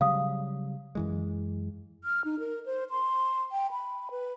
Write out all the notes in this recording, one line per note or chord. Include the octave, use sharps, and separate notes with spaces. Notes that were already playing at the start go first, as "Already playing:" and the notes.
C#3 F#3 G3 F5 D#6
F#2 E3 G#3
F6
D#4
A#4
C5
C6
G5
B5
B4